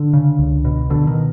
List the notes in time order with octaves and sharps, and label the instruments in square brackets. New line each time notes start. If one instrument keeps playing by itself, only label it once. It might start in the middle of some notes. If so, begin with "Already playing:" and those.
Already playing: [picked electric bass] D3
C#3
C#2
B2
B2 D3
D#3